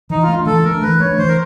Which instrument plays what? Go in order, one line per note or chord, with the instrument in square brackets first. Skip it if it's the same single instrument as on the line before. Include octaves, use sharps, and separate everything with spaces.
[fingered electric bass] E3 [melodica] D#4
[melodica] F4
[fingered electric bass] A3
D4
[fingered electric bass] E3 [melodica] A4
[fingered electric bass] A3 D4 [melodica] A#4
[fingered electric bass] E3 [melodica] B4
[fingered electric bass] A3 [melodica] C#5
[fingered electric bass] D4
[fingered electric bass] E3 [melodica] C5
[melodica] A#4